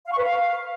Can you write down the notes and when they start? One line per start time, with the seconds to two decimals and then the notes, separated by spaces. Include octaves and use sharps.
0.06 F5
0.12 C#6
0.18 B4
0.23 F5